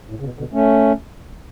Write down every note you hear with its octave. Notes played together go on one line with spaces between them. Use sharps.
A2
C#3
B2
B2 D3
A3 C#4